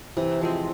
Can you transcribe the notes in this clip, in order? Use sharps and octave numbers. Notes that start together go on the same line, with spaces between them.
C3 E3
F3 G#3 C4